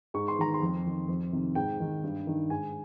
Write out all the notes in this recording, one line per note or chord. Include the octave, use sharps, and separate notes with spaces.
G#2 C#6
C6
D#3 A#5
C6
F2
D#3
F2
C3 D#3
G#2 G5
D#3
G2
D#3
G#2 G#5